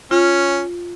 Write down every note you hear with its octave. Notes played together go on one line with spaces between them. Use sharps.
C#4 F4